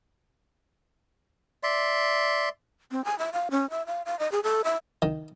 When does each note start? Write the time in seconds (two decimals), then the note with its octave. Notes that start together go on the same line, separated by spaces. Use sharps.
1.63 D5 E5 C6
2.92 C4
3.05 G#5
3.19 E5
3.33 F5
3.51 C#4
3.70 E5
3.87 F5
4.06 F5
4.19 D#5
4.32 G#4
4.43 A4
4.64 E5
5.02 D#3